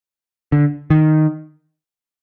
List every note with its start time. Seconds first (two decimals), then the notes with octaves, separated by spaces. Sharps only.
0.52 D3
0.90 D#3